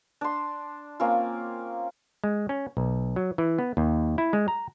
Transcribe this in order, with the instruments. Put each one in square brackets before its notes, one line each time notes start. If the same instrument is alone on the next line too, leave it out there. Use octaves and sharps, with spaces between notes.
[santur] D4 C6
A#3 C4 C#4 F4
[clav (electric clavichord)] G#3
C#4
B1
F#3
E3
B3
D#2
E4
G#3
A#5